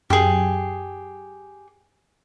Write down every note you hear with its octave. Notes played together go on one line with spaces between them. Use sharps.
F#2 G4 G#4